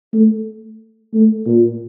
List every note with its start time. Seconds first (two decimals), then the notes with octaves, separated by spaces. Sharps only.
0.13 A3
1.14 A3
1.47 A#2